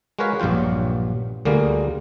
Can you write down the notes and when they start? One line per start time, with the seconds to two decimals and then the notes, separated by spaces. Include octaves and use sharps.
0.19 G#3 F#4 A#4 B4 C#5 F5
0.40 A#1 G2 F#3 F4 G5
1.45 D2 D3 G3 A#3 G#4 A#4